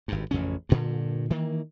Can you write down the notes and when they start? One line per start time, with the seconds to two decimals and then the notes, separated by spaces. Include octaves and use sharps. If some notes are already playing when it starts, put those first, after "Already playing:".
0.08 G#1 G2
0.31 A1 F2 C#3 C#4
0.69 G2 A#2 D3
1.30 D#3 E3 A#3